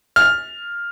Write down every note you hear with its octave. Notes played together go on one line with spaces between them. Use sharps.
F6